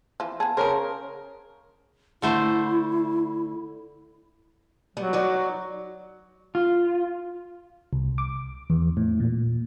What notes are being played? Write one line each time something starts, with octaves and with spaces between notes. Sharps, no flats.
E3 F3
B3 G#4 A5
C#3 C#4 A#4 C5
D3 A3 E4 C5
F#3 G3 B3
D#4 F#4 D5
F4
C2
D6
E2
A2
A#2